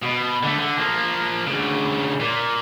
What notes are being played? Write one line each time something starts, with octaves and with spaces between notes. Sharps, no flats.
B2
D3 A3
D3
F3 A#3
D2 C#3
A#2